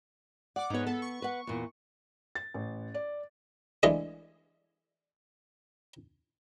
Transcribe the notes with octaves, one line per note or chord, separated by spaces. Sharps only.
D5 F#5 D6
G#2 B3 D#4 C#5
B3 A4
C#6
B4 F#5
E2 A#2
A6
A1
D5
E3 G#3 A3 D4 A4 D#5